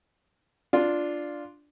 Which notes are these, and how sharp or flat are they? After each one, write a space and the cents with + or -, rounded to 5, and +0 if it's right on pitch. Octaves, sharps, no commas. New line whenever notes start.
D4 +0 F4 +0